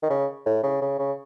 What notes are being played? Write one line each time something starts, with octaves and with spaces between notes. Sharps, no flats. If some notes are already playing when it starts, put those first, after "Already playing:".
D#3
C#3
A2
C#3
C#3
C#3